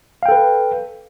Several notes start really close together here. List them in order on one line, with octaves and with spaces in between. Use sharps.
F5 G5 A4 B4